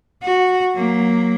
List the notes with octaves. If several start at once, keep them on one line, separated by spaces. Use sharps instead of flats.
F#4
F#3 A#3